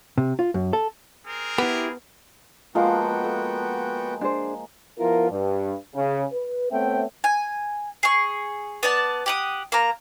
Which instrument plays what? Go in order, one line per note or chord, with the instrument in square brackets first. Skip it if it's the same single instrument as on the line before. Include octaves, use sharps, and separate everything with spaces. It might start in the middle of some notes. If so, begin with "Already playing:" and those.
[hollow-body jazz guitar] C3
F4
F#2
A4
[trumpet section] C4 G#4 A#4
[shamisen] B3 [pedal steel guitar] E4 G4
[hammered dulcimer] F3 G#3 A#3 [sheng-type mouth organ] B3 F#4 G5 [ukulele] F4 F5
[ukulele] A4
D4 G#4 C5
[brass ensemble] F3 B3 E4 F4 A#4
G2
C#3
B4
A3 B3 C4 C#5 E5 G5
[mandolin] G#5
G#4 C#6
B3 D5 A5
G4 F#5 D#6
A#3 A#5